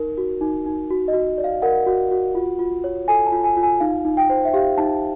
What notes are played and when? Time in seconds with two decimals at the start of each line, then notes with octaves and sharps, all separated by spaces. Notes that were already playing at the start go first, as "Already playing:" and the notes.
Already playing: D#4 A#4
0.18 F#4
0.41 D#4
0.66 D#4
0.90 F#4
1.08 D#5
1.13 F#4
1.38 D5
1.44 F5
1.62 A#4 F#5
1.86 F#4
2.11 F#4
2.35 F4
2.59 F4
2.84 C#5
3.08 A4 G#5
3.26 A5
3.32 F4
3.44 G#5
3.57 F4
3.63 G#5
3.80 D#4 F5
4.05 D#4
4.17 G5
4.30 C5
4.45 E5
4.53 G4 F5
4.78 D#4 A5